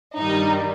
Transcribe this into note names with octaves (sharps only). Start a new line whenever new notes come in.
G2 D#3 G3 D#4